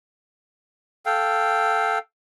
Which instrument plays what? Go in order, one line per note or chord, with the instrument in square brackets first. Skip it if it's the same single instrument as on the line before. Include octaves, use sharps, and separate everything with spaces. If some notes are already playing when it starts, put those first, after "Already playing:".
[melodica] A4 F5 G5